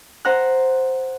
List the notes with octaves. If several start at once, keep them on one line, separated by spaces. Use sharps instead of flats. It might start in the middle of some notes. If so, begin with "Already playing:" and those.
C5 F#5 A#5 F#6